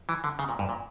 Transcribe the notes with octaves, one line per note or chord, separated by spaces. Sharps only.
E3
D3
C#3
A#2
G2
A#2